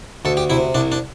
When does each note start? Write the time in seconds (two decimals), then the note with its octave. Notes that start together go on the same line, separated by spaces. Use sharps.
0.25 D2 A4
0.37 G4
0.50 C3 E4
0.75 C2 D4
0.92 D4